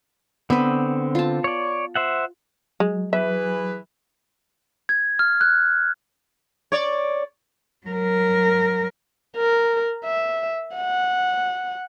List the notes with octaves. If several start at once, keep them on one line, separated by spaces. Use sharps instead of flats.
D3 B3 C4 B4
F4 A5
C#5 D5
C5 E5 F#5
F#3 G#3
E3 G#4 B4 E5
G#6
F6
F#6
C#5 D5
F#3 A#4
A#4
E5
F#5